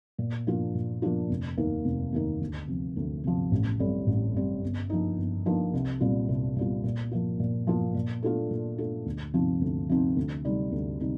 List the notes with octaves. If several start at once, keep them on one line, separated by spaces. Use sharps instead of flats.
A#2
F3 A#3 D4 F4
A#2
F3 A#3 D4 F4
F1
D#2 D#3 A#3 D#4
F1
D#2 D#3 A#3 D#4
D2
C3 F3
D2
C3 F3
A1
A2 G3 C4
A1
A2 G3 C4
G1
G2 F3 A#3 D#4
G1
G2 F3 A#3 D#4
C2
A#2 G3 C4 F4
C2
A#2 G3 C4 F4
A#2
F3 A#3 F4
A#2
F3 A#3 F4
A#2
A3 D4 F4
A#2
A3 D4 F4
D2
C3 F3 C4 D#4
D2
C3 F3 C4 D#4
D2
C3 G3 C4 D#4
D2
C3 G3 C4 D#4